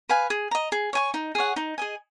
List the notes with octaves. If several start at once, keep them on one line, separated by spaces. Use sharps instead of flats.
B4 F5 G#5
G#4
D#5 A#5
G#4
C#5 G#5 C#6
D#4
G#4 C#5 F#5
D#4
G#4 D#5 G#5